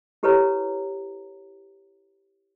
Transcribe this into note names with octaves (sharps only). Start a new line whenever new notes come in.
E4 G4 A4 B4 C#5 A#5